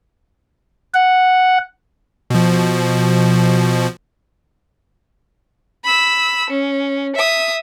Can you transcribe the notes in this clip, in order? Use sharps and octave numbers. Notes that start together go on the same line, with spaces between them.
F#5
B2 F3
B5 E6
C#4
E5 D#6